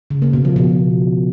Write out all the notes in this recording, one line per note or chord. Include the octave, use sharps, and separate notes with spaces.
C#3
A#3
B2
F3
B2